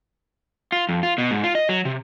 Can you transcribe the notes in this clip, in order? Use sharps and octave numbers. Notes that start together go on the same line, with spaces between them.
F4
F2
F4
B2
G#2
F4
D#5
F#3
C3